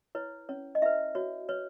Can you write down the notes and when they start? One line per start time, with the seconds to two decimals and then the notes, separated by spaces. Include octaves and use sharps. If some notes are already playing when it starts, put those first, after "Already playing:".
0.15 E4 B4 C#5
0.49 C#4 C#5
0.75 D#5
0.82 E4 B4 E5
1.15 F#4 C#5
1.49 B4 C#5